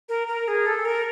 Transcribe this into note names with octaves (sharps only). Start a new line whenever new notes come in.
A#4
A#4
G#4
A4
A#4